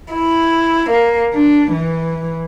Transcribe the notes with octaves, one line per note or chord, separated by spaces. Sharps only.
E4
A#3
D4
E3